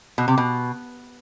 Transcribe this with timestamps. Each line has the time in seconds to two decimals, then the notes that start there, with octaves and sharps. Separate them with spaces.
0.18 B2
0.28 C3
0.38 B2